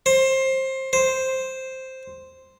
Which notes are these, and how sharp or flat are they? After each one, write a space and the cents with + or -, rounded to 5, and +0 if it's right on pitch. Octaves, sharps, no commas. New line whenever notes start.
C5 +20
C5 +0